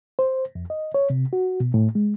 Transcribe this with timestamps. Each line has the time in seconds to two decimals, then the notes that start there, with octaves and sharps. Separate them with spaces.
0.19 C5
0.55 F2
0.70 D#5
0.94 C#5
1.10 C3
1.33 F#4
1.60 B2
1.74 A2
1.95 G#3